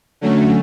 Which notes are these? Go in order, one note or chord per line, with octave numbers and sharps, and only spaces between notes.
D3 F#3 A3 C#4